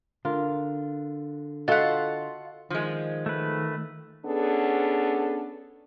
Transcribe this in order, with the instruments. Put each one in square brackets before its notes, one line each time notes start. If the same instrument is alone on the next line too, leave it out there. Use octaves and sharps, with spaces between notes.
[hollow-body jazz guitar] D3 A#4 [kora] F4
[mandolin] F4 F#5 [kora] F#4 A4 [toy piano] D#5 F5
[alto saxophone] D#3 [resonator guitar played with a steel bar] F3 G#3
[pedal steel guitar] A3 B4
[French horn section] B3 C#4 D4 G#4 A4